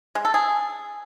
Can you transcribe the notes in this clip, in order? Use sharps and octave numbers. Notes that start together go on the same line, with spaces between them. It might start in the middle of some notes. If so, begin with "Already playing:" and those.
G#3
A4
G#4